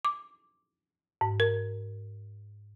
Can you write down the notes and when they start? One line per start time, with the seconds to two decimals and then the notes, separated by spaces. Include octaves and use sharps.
0.05 D6
1.21 G#2
1.40 A#4